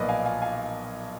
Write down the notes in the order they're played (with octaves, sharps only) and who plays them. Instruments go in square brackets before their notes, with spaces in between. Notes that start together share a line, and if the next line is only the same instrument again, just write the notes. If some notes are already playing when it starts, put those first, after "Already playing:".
Already playing: [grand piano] B1 A#2 F3 A#4 B4 D5 D#5
F5 G#5
F5 G#5
F5 G#5